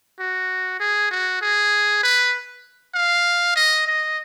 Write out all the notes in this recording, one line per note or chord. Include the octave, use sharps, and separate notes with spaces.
F#4
G#4
F#4
G#4
B4
F5
D#5
D#5